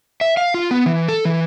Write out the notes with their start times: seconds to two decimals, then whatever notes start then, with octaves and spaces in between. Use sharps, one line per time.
0.21 E5
0.37 F5
0.54 F4
0.71 B3
0.86 E3
1.08 A4
1.25 E3